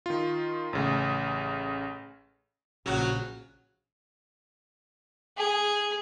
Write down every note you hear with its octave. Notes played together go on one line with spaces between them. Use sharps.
D#3 F4
A1 C#3 A3
A#1 C#3 F#3 F#4
G#4